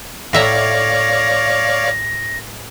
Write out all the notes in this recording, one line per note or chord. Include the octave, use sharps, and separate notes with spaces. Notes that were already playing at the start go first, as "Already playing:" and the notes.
A2 C#5 D5 E5 F5 A#5 A#6